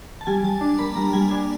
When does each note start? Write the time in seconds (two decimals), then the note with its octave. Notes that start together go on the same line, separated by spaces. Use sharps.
0.21 A5
0.27 G3 G#5
0.43 G3 A5
0.61 D4
0.79 A#3 B5
0.95 G3 A#5
1.13 G3 G#5
1.30 D4 G#5